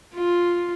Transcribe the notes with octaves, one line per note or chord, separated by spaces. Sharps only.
F4